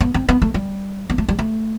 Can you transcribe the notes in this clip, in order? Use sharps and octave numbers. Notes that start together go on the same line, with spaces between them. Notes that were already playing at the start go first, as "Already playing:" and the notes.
B3
C4
B3
A3
G3
B3
A3
G3
A3